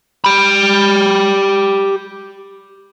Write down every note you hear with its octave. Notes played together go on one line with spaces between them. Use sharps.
G4 B5